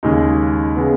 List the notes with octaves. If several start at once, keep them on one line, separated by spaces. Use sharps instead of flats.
D#2 C#3 G#3 D#4
C#3 G#3 B3